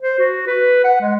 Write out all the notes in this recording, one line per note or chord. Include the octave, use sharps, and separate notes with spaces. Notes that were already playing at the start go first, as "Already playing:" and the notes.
C5
F#4
B4
F#5
G#3